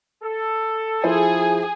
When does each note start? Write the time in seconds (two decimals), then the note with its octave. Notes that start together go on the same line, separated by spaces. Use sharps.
0.22 A4
1.04 F3 E4 G#4 C5